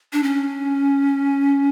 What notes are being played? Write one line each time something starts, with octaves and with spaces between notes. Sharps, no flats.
D4
C#4